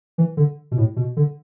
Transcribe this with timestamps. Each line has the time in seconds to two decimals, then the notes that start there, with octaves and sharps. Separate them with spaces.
0.18 E3
0.37 D3
0.71 B2
0.78 A2
0.96 B2
1.17 D3